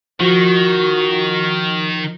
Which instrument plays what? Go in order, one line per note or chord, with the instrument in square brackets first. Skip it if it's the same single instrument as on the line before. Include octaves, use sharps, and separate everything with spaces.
[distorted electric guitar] D#3 [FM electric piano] F3 [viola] F#4